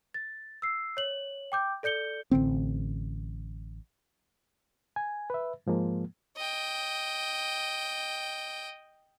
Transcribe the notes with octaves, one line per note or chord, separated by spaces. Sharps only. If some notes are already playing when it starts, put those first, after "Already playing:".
A6
E6 C7
C#5 F#7
G5 D6 G6
A4 D5 G6 C#7 G7
A1 D3 C4
G#5
B4 E5
G#2 F3 G#3 A#3
D#5 G5